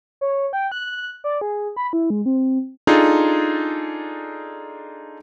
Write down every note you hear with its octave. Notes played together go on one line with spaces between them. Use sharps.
C#5
G5
F#6
D5
G#4
B5
E4
G#3
C4
D4 D#4 F4 G#4 A4